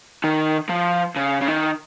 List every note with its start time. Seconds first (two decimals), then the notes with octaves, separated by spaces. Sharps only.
0.24 D#3
0.70 F3
1.17 C#3
1.42 C#3
1.48 D#3